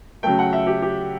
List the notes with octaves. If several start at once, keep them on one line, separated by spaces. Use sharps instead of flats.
C#3 F#3 A3 G5
F#5
E5
G4
G4